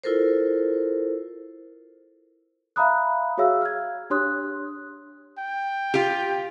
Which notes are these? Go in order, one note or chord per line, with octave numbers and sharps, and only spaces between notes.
E4 F4 A4 A#4 C5
E5 F5 A#5 B5 D#6 F#6
F#4 G#4 C#5 E5 F5 E6
F6 G#6
D4 G4 C#5 C6 D#6 F#6
G5
F4 G4